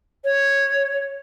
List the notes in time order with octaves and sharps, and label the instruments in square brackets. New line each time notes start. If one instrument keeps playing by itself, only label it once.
[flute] C#5